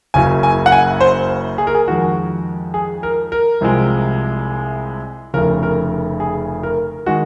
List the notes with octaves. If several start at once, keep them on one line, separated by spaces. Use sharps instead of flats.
F#1 F#2 C#3 F#3 G#5
G#5
F#5
G#5
C5
G#4
A#4
G#4
F2 D#3 G#3 F#4
G#4
A#4
A#4
C2 C3 F3 G#3
F1 F2 C#3 A#4
A#4
G#4
A#4
D#3 G#3 F#4